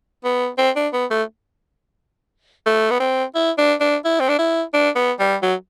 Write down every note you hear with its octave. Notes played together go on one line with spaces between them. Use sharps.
B3
C4
D4
B3
A3
A3
B3
C4
E4
D4
D4
E4
C4
D4
E4
D4
B3
G3
F#3